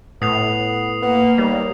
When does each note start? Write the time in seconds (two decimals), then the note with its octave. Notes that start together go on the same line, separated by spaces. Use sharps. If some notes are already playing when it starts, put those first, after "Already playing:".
0.22 A2 B3 D#6 C7 F7
1.02 A#3 B3
1.38 D#2 G3